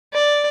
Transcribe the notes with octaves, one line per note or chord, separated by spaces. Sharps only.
D5